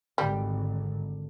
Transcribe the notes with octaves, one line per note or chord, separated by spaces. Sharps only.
G#1 D3 G3